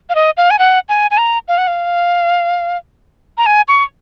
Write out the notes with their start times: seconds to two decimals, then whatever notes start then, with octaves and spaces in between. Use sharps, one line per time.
0.09 F5
0.15 D#5
0.37 F5
0.50 G#5
0.59 F#5
0.89 G#5
1.11 G#5
1.18 A#5
1.48 F5
1.58 F#5
1.67 F5
3.38 A#5
3.46 G#5
3.68 C#6